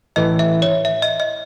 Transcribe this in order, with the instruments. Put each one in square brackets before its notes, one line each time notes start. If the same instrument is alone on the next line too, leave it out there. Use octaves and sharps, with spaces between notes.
[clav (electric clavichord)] A1 A2 E3 [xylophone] D#5
[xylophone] E5
C#5
E5
D#5
D#5